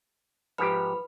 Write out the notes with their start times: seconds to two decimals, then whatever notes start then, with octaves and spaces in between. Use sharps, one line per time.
0.58 G#2 F3 G4 B4 B5 F6